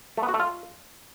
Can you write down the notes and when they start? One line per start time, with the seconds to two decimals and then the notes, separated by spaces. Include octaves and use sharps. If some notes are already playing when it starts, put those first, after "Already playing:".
0.17 A3
0.23 B3
0.28 F#4
0.34 A3
0.39 F4